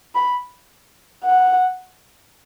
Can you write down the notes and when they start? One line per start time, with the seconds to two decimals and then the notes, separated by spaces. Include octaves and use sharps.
0.15 B5
1.25 F#5